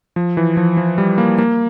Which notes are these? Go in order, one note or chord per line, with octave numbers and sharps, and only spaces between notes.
F3
E3
F3
F3
G3
A#3
A#3